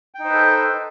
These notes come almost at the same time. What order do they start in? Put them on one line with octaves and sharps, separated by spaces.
G5 D#4 C5 B4 A4